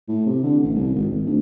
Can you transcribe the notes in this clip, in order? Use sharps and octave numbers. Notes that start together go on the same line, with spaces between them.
A2
C3
D3
A1
C2
G#1
G#1
D2